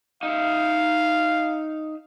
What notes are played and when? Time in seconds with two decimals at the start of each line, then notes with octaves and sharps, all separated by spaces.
0.23 D#4 E5 F5